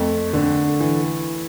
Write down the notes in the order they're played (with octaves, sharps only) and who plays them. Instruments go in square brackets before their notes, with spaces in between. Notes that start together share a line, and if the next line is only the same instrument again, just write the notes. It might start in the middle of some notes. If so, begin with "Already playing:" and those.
Already playing: [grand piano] F2 A3
D3
E3